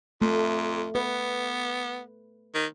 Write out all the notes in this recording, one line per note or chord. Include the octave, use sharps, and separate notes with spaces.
F2 A3
B3 B4
D#3